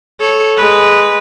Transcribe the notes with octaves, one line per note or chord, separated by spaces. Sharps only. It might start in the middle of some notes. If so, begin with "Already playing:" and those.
A4 C#5
G#3 B4